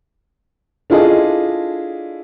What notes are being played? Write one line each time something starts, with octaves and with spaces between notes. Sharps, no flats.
D4 E4 F4 G#4 A4 D#5